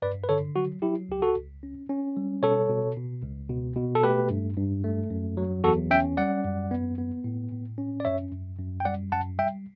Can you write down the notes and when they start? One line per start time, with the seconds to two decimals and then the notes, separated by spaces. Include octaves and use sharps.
0.02 G2 B4 D5
0.24 B4
0.29 D3 A4 C#5
0.56 F#3 F#4
0.82 F#3 E4 G4
1.09 C#2 G4
1.22 F#4 A4
1.36 C#2
1.63 C#4
1.89 C#4
2.17 G3
2.42 B2 A4 C#5
2.69 B2
2.96 B2
3.23 C#2
3.49 B2
3.76 B2
3.95 A4
4.03 A3 G4 B4
4.30 G2
4.57 G2
4.84 A3
5.10 F#2
5.37 F#3
5.64 E2 F#4 A4
5.90 C#4 E5 G5
6.17 G3 D5 F#5
6.44 F#2
6.71 B3
6.98 B3
7.24 A2
7.52 A2
7.78 C#4
8.00 D5
8.05 F#2 C#5 E5
8.31 F#2
8.59 F#2
8.80 G5
8.85 G3 D5 F#5
9.12 F#2 F#5 A5
9.39 G3 E5 G5